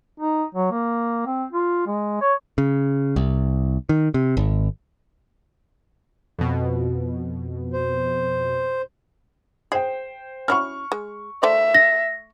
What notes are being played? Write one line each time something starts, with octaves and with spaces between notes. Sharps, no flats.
D#4
F#3
A#3
C4
F4
G#3
C#5
C#3
C2
D#3
C3
G#1
F2 B2
C5
G#4 C5 G5
C#4 E4 F#4 C#6 F6
G#3
A3 C5 D5 E5
A#6